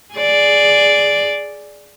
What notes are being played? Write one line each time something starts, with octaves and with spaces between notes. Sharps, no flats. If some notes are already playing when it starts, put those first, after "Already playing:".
G#4 D5